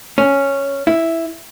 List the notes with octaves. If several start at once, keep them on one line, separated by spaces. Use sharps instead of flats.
C#4
E4